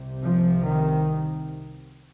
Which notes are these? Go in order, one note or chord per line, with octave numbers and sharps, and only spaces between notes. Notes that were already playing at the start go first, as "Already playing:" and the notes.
Already playing: C2 C3
F3
D#3